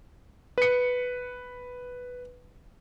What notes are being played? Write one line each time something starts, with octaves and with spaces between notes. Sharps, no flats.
B4 C#7